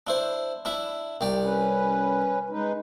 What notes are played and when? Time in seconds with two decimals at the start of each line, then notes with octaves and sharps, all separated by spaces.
0.07 D4 E4 C5
0.65 D4 E4 E5
1.21 C2 G4 D5
1.43 C#4 B4
2.50 G#3 D#4 B4